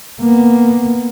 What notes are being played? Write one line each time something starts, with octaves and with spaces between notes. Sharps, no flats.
A#3 B3